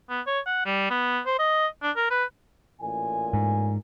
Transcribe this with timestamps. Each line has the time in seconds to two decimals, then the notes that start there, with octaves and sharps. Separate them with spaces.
0.10 B3
0.27 C#5
0.46 F#5
0.66 G3
0.90 B3
1.26 C5
1.39 D#5
1.82 D4
1.96 A#4
2.11 B4
2.81 A1 A#2 G#5
3.33 G#2